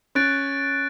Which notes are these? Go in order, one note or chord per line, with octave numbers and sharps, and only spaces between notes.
C#4 F#6 A6 D7